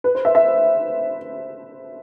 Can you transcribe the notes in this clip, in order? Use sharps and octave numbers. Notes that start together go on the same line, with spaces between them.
B4
C5
E5
E5